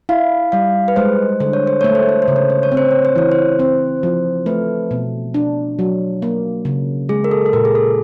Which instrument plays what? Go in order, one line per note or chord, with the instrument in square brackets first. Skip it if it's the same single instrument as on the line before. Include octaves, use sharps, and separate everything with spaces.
[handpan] E4 [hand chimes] F5
[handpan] G3 [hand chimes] F5
[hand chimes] B4
[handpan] G#3 [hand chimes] C5
[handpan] D3 [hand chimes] C5
[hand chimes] C#5
C5
[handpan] A3 [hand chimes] C#5
[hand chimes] C5
C#5
C5
[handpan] C#3
[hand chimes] C#5
C5
C#5
[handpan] C4
[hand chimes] C5
C#5
C5
[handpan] E3 [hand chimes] C#5
[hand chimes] C5
[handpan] C4 [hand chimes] C5
[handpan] F3
[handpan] A3 [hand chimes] B4
[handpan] B2
D4
F#3
A#3
C#3
[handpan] G#3 [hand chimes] G#4
[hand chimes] A#4
A4
A4
[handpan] A#2 [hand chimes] A#4
[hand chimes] G#4
A4